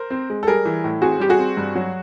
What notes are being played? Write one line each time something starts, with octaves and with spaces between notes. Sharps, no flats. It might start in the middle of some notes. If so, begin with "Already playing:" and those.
Already playing: A#4 C5
C4
G#3
A4
G3 G#4 A#4
E3
A2
C4 F#4 G#4
G3 G4
F#4 G#4
C4
G2
F#3